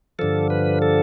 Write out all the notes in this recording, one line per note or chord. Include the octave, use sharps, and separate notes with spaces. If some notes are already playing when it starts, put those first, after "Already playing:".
G2 D3 F3 A4
B4
A4